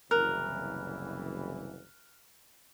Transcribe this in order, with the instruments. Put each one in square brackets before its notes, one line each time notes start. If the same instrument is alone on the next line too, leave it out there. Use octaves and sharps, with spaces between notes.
[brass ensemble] F#1 C2 E3 [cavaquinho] A#4 [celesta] F6 F#6